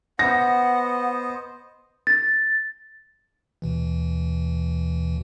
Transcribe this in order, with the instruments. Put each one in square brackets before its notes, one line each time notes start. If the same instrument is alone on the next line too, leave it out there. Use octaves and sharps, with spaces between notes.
[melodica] B3 C5 D#5 [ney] F#5 [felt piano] A#6
[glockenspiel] A6
[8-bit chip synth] D#2 B2 E3